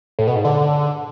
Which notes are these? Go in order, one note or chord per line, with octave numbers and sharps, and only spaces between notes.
A2
B2
G#2
D3